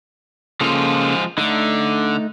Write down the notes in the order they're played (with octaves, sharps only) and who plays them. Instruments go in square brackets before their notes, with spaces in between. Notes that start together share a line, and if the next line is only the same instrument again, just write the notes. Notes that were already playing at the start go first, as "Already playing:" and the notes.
[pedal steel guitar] C#3 A#3 A4 [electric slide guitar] F3 G#3 F4
[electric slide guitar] D3 [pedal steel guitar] A3 D#4